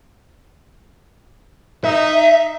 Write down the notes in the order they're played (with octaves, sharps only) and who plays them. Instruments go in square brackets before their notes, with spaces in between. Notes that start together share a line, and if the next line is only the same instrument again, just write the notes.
[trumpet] D#4 [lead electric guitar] E5